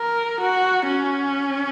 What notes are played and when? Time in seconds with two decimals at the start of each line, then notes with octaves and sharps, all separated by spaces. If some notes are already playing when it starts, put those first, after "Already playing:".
Already playing: A#4
0.41 F#4
0.88 C#4